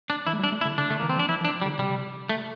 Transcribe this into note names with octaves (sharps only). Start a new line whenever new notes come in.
D4
E3 E4
A3
G3 D4
A3
E4
D3
D3 D4
D3 A3
E3 A#3
C4
F3 D4
F3 E4
F3 D4
G3
D3
C3 G3
A3